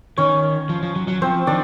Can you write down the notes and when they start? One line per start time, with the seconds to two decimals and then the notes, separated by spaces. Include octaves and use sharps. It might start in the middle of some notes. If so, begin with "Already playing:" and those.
0.17 D#3 C#4 C#5
0.69 F3
0.83 F3
0.96 F#3
1.08 F#3
1.22 F3 C4 C5
1.47 D#3 D4 D5